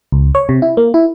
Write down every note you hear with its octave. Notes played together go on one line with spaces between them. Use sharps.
C#2
C#5
C3
E4
A#3
E4